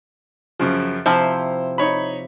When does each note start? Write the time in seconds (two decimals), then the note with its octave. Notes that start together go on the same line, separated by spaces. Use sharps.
0.60 F#2 C#3 F3
1.06 C3 F3 E4 C5 F6
1.78 D#4 C#5 B5